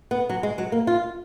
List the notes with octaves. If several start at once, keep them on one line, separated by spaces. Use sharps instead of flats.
B3
F#3
G#3
F#3
A#3
F4